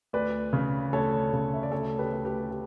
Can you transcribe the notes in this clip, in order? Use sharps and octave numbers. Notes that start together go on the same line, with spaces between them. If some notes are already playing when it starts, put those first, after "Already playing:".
D2 B4 D5
C#3
D2 A4 C#5
C#3
E5
D5
D2 A4 C#5
G4 B4
D2
G4 B4
G4